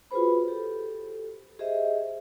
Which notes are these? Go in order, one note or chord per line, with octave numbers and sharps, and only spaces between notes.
F4 F#4 G#4 B4 C5 B5
G4 A4
G4 G#4 C5 D#5 E5